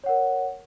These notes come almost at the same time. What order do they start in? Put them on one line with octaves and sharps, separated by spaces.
C#5 F#5 A#4